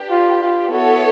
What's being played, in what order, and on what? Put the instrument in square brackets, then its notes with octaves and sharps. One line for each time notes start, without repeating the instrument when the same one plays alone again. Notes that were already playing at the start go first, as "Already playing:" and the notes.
Already playing: [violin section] D4 G4 B4
[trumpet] F4
F4
[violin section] B3 E4 A4 C#5 [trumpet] F#4